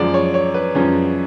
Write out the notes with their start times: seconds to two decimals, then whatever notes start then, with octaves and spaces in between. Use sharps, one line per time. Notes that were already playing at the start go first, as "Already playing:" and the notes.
Already playing: F#2 F3 G#3 D5
0.14 C#5
0.34 C#5
0.54 B4
0.75 F#2 F3 G#3 C#4